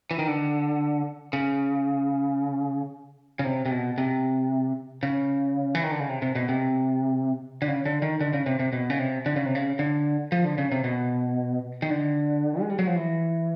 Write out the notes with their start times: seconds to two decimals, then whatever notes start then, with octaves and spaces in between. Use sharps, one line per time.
0.11 E3
0.19 D#3
0.28 D3
1.33 C#3
3.39 C#3
3.44 C3
3.66 C3
3.71 B2
3.98 C3
5.03 C#3
5.75 E3
5.83 D#3
5.91 D3
6.00 C#3
6.09 C3
6.22 C3
6.35 B2
6.49 C3
7.62 D3
7.68 C#3
7.85 D3
8.02 D#3
8.21 D3
8.33 C#3
8.46 C3
8.59 C3
8.73 B2
8.90 C#3
8.99 C3
9.26 D3
9.36 C#3
9.46 C3
9.55 C#3
9.79 D3
10.32 F3
10.45 D3
10.58 C#3
10.72 C3
10.84 B2
11.82 D#3
11.90 D3
12.60 G#3
12.70 G3
12.79 F#3
12.87 F3
12.96 E3